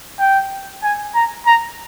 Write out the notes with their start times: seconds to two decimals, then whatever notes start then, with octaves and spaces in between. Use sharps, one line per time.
0.19 G5
0.83 G#5
1.15 A#5
1.46 A#5